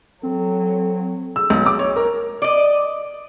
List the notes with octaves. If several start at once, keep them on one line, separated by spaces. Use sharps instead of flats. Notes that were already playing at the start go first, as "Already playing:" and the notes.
F#3 C4 A4
E6
B1
D6
C#5
A#4
D5 D#5